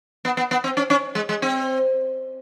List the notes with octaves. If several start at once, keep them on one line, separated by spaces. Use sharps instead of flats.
B3
B3
B3
C4
C#4
C#4
G#3
G#3
C4